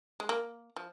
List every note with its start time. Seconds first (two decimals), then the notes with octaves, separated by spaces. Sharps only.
0.20 G#3
0.29 A#3
0.76 F3